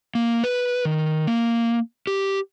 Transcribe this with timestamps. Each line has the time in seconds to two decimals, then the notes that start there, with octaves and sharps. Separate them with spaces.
0.15 A#3
0.44 B4
0.85 D#3
1.27 A#3
2.07 G4